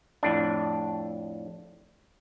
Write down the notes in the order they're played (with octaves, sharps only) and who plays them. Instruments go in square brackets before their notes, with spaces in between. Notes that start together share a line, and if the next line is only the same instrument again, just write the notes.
[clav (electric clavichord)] F2 A2 D4